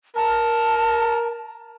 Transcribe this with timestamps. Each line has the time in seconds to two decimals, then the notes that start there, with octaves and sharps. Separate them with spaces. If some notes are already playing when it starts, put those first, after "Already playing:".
0.16 A#4 A5